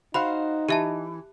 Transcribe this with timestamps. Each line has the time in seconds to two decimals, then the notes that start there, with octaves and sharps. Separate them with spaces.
0.14 D#4 F#4 C5 F5 B5
0.69 E3 G4 E5 A5